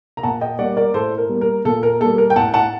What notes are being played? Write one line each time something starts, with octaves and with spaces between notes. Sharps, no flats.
A#5
A#2 F#5 A5
D#5 G5
G3 A#3 D5 F#5
A#4 D5
A2 A4 C5
A#4
G3 A#3
A#4
A#2 A4
A#4
G3 A#3 A4
A#4
G5
A2 F#5 A5
F#5 A5